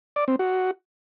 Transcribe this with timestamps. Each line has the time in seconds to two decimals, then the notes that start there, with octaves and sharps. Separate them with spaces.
0.16 D5
0.28 C4
0.39 F#4